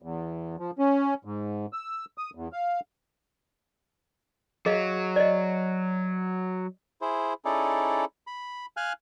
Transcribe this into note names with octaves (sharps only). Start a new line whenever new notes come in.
E2
F3
C#4
G#2
E6
D#6
E2
F5
F#3 G#4 D#5 F5
D5 D#5
E4 G#4 C5
C#4 D#4 E4 G#4 A4 D5
B5
F5 G#5 F6 F#6